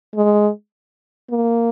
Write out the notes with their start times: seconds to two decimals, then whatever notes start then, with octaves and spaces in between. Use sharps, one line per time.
0.15 G#3
1.31 A#3